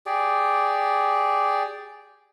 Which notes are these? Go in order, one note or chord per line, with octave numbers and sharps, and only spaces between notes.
G4 G#4 D5